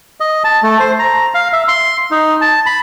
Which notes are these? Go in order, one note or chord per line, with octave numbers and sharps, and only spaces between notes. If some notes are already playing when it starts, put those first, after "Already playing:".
D#5
A5
A3
C5
A#5
F5
E5
C6
D#4
A5
B5